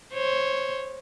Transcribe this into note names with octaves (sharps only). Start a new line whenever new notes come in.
C5 C#5